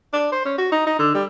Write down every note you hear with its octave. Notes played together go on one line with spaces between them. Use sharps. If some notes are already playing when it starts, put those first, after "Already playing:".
D4
C5
C#4
F#4
D#4
D#4
D3
G3